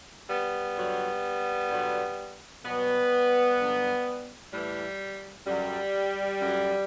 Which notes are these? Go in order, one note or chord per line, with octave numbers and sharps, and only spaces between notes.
G3 B3
G2 D3 F#3
G2 D3 F#3
B2 F#3 G3 B3
G2 D3 F#3
A2 E3 G3
F#2 D3 F#3 G3
F#2 D3 F#3